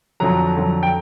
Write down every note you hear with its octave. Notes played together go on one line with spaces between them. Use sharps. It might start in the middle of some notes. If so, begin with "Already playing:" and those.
F2 D3 F#3 A#5
F2 D3 F#3
G5